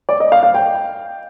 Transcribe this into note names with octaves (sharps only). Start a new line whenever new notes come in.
D5
D#5
F5
F5
G5